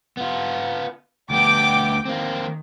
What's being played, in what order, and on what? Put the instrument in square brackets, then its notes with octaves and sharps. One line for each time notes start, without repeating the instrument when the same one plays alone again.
[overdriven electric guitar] B3 F4
[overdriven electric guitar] D2 B3 [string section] G5 D6
[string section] D#3 [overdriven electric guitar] A#3 C4